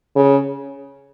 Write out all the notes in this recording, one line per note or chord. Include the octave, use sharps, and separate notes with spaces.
C#3